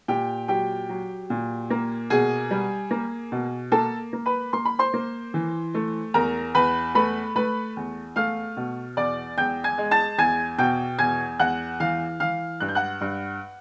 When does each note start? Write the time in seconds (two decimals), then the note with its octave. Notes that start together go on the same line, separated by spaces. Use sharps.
0.08 A#2 G4 G5
0.48 F#3 G4 G5
0.89 F#3
1.30 A#2
1.70 A#3
2.10 B2 G#4 G#5
2.51 G3
2.91 A#3
3.32 B2
3.72 A#3 A4 A5
4.13 A#3
4.26 B4 B5
4.53 A#3 C6
4.65 B5
4.79 C5 C6
4.94 A#3
5.34 E3
5.74 A3
6.14 E2 A#4 A#5
6.55 E2 B4 B5
6.95 A3 B4 B5
7.36 A3 B4 B5
7.77 E2
8.16 A3 F5 F6
8.57 B2
8.97 E2 D5 D6
9.38 E2 G5 G6
9.64 G#5 G#6
9.78 G#3
9.91 A5 A6
10.18 E2 G#5 G#6
10.58 B2 G5 G6
10.99 E2 G#5 G#6
11.40 E2 F#5 F#6
11.80 E3 F5 F6
12.20 E3 F5 F6
12.60 G2 F#6
12.68 G6
12.75 F#5 F#6
13.01 G2